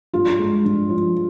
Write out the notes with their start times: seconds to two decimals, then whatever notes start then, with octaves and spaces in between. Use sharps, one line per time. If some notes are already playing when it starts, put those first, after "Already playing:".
0.14 G2 F4
0.39 G#3
0.65 G2
0.89 F3